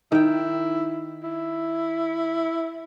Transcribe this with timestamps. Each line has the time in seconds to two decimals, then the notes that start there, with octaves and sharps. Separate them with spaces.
0.12 D#3 E4 G5
1.24 E4